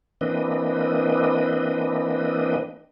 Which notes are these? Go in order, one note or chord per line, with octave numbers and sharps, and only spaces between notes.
E3 A#3 C4 D4 B4 D#5